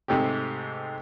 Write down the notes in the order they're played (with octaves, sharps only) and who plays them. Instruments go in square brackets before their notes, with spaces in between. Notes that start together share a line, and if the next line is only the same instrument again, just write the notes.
[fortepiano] G#2 C3 A3 G4